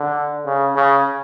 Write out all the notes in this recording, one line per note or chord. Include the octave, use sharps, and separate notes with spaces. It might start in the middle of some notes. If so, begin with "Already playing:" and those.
Already playing: D3
C#3
C#3